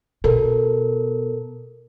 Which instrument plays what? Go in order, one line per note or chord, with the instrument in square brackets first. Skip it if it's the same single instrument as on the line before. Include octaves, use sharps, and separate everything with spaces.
[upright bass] B2 [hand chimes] A4 A#4